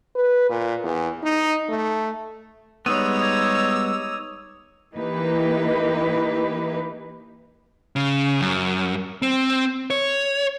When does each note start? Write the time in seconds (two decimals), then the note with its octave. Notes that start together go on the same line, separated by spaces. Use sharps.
0.15 B4
0.50 A#2
0.84 E2
1.23 D#4
1.69 A3
2.86 G3 G#3 B3 D#4 C#5 D#6 E6 D#7
3.21 D6 G#6 F7
4.94 E3 A#3 D#4 E4 G4 B4
7.96 C#3
8.41 F#2
9.22 C4
9.90 C#5